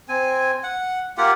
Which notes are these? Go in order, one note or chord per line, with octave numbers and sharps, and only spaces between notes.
C4 G#5
F#5
A#3 F4 G4 F#5